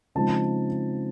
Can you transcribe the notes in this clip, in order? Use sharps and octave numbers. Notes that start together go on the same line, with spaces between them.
C#3 F3 G#3 C4 D#4 A5